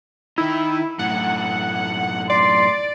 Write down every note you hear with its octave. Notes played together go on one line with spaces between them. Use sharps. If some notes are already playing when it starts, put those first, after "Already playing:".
D#3 D#4 E4
F#2 A2 F#5
D5 C6